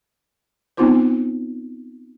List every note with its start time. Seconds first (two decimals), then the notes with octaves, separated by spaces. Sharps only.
0.77 B3 C4 D#4 F4 C5